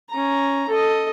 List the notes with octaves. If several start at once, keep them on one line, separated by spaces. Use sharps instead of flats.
C#4 A#5
A4 D#5